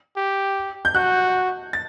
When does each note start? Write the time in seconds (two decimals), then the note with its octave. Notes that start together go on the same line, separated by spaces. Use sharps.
0.17 G4
0.85 G6
0.95 F#4 F#6
1.73 A6